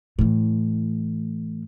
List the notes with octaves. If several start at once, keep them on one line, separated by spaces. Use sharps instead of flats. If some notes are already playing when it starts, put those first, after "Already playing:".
A2 E3